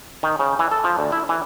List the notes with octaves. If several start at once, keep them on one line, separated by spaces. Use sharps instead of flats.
D#3
C#3
E3
A4
F3
D2
E4
E3